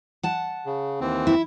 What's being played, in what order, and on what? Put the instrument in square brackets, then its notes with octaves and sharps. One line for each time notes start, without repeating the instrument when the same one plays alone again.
[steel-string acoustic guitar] F#5 A5
[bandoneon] C#3
D#2 E3 C4
[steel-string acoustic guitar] E4